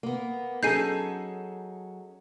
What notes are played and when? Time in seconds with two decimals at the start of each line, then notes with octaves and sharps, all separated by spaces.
0.03 A#3 B3
0.63 F#3 C#4 D#4 G#4 A4 G6 C7 D#7